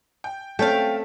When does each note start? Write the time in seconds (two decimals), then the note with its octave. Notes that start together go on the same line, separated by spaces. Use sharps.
0.24 G5
0.59 A3 C4 C#4 F5 G5 A5